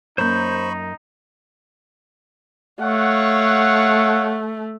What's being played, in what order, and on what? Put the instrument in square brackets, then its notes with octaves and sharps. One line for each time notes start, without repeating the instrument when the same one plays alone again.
[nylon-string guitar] F#2 A#3 [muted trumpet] D#4 [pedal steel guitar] C5 G6 [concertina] B5 C#6
[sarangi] A3 [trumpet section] C#5 F5 F#5